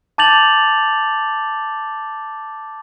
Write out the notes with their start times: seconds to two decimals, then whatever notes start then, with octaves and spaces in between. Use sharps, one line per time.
0.18 A5 D6 G6 A6 F7 F#7